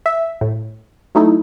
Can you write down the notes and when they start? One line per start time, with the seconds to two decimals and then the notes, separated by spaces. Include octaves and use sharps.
0.06 E5
0.41 A2
1.15 F#3 A3 D#4 E4